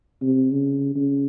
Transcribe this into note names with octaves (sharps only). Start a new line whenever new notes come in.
C3
C#3
C#3